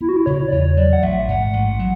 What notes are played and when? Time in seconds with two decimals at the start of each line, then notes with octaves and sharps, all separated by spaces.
0.01 B3 E4
0.09 F#4
0.16 E4
0.26 C#3 C#5
0.48 D5
0.52 E2 C#5
0.77 F#3 D5
0.93 F#5
1.02 A1 E5
1.28 G#2 F#5
1.53 A1
1.79 F#3